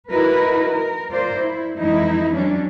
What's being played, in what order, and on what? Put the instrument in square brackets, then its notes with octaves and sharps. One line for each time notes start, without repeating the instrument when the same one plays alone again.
[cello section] D#4 E4 F#4 A#4 B4
A#4
F4 A#4 C5 D5
E4
F2 E3 F3 G#3 D#4 E4
F#3 C#4 D4